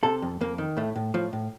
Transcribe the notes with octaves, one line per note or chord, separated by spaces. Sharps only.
C3 A4
F2
F2 A#3
D#3
A2 A3
A2
A2 F3
A2